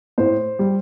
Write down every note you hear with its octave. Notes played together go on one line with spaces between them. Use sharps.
A2 C5
G3